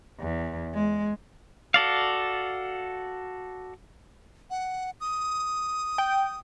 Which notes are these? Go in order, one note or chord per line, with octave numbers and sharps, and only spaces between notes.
E2
G#3
F#4 A4 D5 F5
F#5
D#6
G5